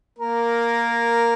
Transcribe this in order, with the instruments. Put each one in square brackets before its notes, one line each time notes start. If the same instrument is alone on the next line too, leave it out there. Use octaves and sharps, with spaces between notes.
[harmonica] A#3 A#4